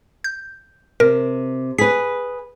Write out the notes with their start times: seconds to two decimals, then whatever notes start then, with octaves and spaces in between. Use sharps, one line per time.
0.24 G6
1.00 C3 A#4
1.78 G#4 B4 B6